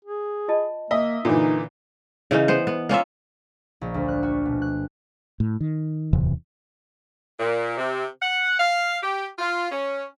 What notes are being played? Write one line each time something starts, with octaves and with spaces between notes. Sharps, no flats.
G#4
F4 D#5 A5
A#3 D#5 E5 G#5
A#2 D3 E3 D#4
C#3 E3 C#4 D#4
B3 C5
B3
A#3 C#4 F4 E5
A#1
D2
F#6
F#4
B2
F#6
A2
D#3
D1 E2 C3 E3
A#2
C3
F#5
F5
G4
F4
C#4